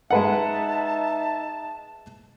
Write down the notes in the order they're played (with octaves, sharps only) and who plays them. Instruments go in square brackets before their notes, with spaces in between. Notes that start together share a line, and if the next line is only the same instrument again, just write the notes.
[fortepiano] G#3 B4 F#5 [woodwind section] D#4 E5 A5